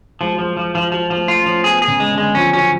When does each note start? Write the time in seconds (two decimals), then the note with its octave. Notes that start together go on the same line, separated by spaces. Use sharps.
0.21 F3 G#3
0.32 F#3
0.39 F3 G#3
0.57 F3
0.75 F3
0.92 F3 F#3
1.10 F3
1.16 A3
1.28 F4
1.41 C#4
1.46 F3
1.64 B3 G#4
1.82 G#4
1.87 C#3
2.00 G#3
2.12 D3
2.18 G#3
2.35 F3 C#4
2.53 F#3 C#4